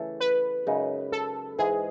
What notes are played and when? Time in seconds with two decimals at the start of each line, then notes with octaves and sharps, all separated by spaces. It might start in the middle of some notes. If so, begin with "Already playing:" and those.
Already playing: C#3 E3 A3 A4
0.20 B4
0.67 F#2 C#3 G#3 D#4
1.12 A4
1.59 G#2 E3 G#3 G#4